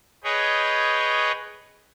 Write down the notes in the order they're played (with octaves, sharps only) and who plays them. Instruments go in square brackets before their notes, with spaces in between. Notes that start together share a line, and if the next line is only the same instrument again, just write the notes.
[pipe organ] G#4 B4 C#5 D#5 G5